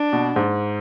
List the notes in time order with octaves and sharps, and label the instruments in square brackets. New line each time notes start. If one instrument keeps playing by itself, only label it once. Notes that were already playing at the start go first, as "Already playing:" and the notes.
Already playing: [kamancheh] D4
[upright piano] B2
G#2